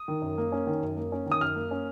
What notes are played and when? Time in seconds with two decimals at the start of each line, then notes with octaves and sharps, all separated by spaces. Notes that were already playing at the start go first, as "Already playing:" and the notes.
Already playing: D#6
0.08 D#3
0.22 F#2
0.38 A#3
0.52 C#4
0.67 D#3
0.82 F#2
0.97 A#3
1.12 C#4
1.26 D#3
1.32 D#6
1.41 F#2 F6
1.56 A#3
1.71 C#4